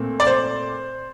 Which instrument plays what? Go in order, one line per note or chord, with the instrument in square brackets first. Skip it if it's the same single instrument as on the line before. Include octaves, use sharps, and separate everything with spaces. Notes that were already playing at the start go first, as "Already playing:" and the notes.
Already playing: [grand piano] A#2 A3 C4
D5
C5